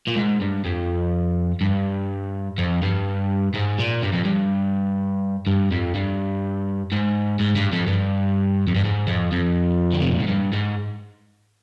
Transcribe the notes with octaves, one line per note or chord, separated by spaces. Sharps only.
A#2
G#2
G2
F2
G2
F2
G2
G#2
A#2
G2
F2
G2
G2
F2
G2
G#2
G#2
G2
F2
G2
F2
G2
G#2
F2
F2
D3
C3
A#2
G#2
G2
G#2